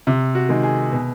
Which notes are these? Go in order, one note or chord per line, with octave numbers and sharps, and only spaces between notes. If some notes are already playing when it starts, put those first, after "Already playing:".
C3
F#4
D#3 G#3
G#4
B2